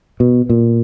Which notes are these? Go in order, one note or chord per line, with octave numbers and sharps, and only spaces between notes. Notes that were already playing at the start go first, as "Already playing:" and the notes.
B2
A#2